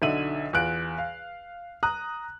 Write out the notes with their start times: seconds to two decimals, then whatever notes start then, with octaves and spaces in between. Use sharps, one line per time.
0.02 B1 D3 D#4 E5 D#7 F#7
0.53 E2 F4 F#6 D7
0.98 F5
1.83 A#5 D#6 F#6